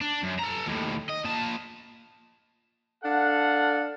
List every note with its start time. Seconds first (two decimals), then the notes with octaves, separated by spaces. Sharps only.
0.01 D4
0.23 F#2
0.39 A4 A#5
0.66 D#2 A2
1.09 D#5
1.24 A#2 A5
3.03 D4 A4 F5 F#5